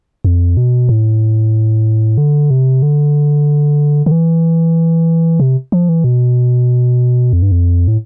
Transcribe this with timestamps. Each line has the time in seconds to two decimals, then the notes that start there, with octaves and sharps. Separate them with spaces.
0.25 F2
0.57 B2
0.89 A2
2.18 D3
2.50 C3
2.82 D3
4.06 D3
4.11 E3
5.40 C3
5.72 F3
5.89 E3
6.04 B2
7.33 F2
7.42 G2
7.52 F2
7.88 A2